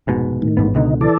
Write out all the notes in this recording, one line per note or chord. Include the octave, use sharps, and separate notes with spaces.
F1 G#2 B2
A2 D#3
A1 G#2 B3
C#2 B2 D3 D#4
E3 A4 D5